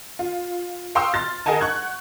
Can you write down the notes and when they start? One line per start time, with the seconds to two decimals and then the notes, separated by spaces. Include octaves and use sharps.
0.19 F4
0.95 F5 G5 C6 C#6 D#6 E6
1.14 C6 F6 A6
1.46 G#4 A#4 D#5 F#5 G#5 A5
1.60 F#5 C#6 F#6 G#6